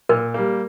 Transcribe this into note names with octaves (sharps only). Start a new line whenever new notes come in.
A#2 A#4
G3 A#3